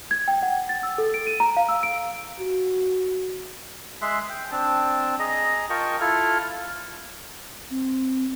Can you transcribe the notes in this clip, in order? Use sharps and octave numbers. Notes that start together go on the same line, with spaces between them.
G#6
G5
F#5
A6
E6
A4
D7
D#7
A#5
F5
E6
D7
F#4
G#3 G#4 E5 C6 F#6
G5
C4 D4 A5
G#4 D#5 A#5
F4 A#4 D#5 G5 A5 C#6
E4 F4 A4 F6
C4